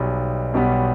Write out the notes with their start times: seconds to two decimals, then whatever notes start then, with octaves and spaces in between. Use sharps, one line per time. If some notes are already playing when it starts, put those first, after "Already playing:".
Already playing: B1 B2 G3 B3
0.54 B1 B2 G3 B3